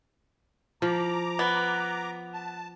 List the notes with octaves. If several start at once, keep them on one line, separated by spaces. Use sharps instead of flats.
F3 A#5 D6
B3
A5